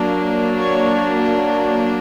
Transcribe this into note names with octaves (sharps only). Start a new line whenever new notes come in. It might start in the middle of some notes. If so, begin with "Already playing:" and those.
Already playing: F#3 A#3 D4
C#5